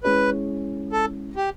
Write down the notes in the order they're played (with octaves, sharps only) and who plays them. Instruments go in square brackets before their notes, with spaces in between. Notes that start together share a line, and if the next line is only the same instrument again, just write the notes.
[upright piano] G#3 C#4 E4 G#4 C#5 [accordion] B4
[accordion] A4
G4